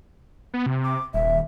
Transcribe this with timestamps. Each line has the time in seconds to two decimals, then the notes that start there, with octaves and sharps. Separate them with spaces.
0.54 B3
0.66 C3
0.84 D6
1.14 D#1 E5